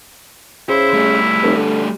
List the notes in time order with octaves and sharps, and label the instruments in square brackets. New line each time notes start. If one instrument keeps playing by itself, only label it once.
[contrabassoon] C#3 [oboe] E4 [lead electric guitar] C5
[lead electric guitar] G3 A3
[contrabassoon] F1
D3